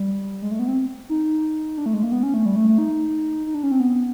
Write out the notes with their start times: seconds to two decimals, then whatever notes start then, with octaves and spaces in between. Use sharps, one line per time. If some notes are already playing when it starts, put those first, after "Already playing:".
Already playing: G3
0.42 G#3
0.51 A3
0.59 B3
0.68 C4
1.09 D#4
1.78 D4
1.86 A3
1.94 G#3
2.03 A#3
2.12 B3
2.23 C#4
2.34 A3
2.46 G3
2.56 A3
2.68 A3
2.78 D#4
3.46 D#4
3.54 D4
3.63 C#4
3.72 C4
3.80 B3